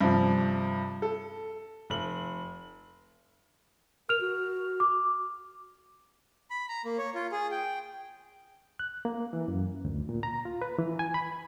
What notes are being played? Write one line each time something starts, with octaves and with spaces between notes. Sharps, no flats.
G2 C3 F3
A4
F1 F#7
A#4 F6 F7
F#4
D6
B5
A#5
A#3
C#5
F4
G#4
G5
F#6
A#3
E3
F#2
D2
A#2
A#5
F4
B4
E3
G#5
B5